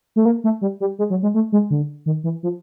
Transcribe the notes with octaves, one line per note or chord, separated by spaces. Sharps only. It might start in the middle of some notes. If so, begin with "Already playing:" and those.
A3
A#3
A3
G3
G3
G#3
F#3
G#3
A3
G#3
D3
D#3
E3
F3